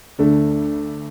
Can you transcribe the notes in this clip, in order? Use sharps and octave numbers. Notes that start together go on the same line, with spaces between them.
D2 D3 A3 D4